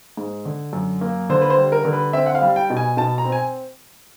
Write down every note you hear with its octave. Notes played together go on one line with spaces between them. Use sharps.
G#2
D3
F#2
A#3
D3 C5
B4
C5
G3
A#4
D3 A#4
B4
C4 E5
F#5
F5
G3
G5
B2
G#5
B2 A5
A#5
C4
G#5